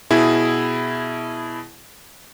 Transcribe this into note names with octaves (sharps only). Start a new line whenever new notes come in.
B2 E4 G#4